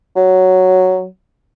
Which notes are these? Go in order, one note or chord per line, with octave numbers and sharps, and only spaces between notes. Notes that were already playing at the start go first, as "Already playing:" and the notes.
F#3